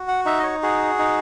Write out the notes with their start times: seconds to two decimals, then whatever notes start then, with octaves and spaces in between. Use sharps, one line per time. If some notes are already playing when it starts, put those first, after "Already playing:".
Already playing: F#4
0.08 F#5
0.26 D#4 E5
0.39 D#5
0.44 C#5
0.63 F#4 G#4
0.99 D#4